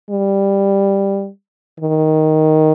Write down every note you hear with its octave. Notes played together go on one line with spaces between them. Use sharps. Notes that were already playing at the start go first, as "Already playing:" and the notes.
G3
D#3